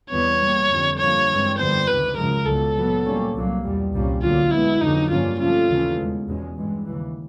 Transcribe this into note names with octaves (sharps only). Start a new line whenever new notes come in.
E2 C3 E3 G3 B3 C#5
B2 G3 A#3
F2 D3 G3
G2 D3 F3 A#3 C#5
G2 E3 G#3 C4
F2 D3 G3 B3 C5
C#2 C3 D#3 B4
F#2 C#3 F3 G#3 A#4
C#2 B2 F#3 A4
A#2 F#3 B3
A#2 G3 A#3 C#4
C2 A#2 F#3 A#3
E2 B2 G3
C2 A#2 G3 A#3 C#4
D2 D3 F#3 A#3 F4
B2 G#3 B3 E4
F2 D3 F#3 D#4
G2 D3 F3 A#3 C#4 F4
C3 F3 A3 C#4 F4
D#2 C#3 E3 A3 C#4
E2 B2 G#3
E2 B2 G#3 C#4
G2 E3 G#3
D#2 C#3 E3